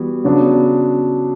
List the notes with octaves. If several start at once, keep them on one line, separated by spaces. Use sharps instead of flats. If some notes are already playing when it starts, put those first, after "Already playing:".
Already playing: E3 G3 B3 F#4
C#3 F#3 B3 D4